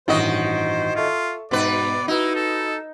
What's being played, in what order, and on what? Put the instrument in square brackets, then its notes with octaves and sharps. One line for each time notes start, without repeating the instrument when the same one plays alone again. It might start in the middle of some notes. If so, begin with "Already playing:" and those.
[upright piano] A1 G2 [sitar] D#3 F#4 D#5 [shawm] C5
[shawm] F4 [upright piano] A4 E5 C#6
[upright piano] G#2 [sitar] B2 B4 [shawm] D5
[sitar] D#4 [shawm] E4 [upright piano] F#4 B4
[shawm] A4